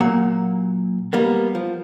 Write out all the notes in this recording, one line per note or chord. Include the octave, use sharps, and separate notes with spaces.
A#2 F#3 A#3 F#5
G3 A#3 B3
F3